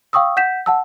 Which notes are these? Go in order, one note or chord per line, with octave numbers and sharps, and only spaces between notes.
F5 G5 C#6 D#6 E6
F#5 G6 B6 E7
F#5 A5 E6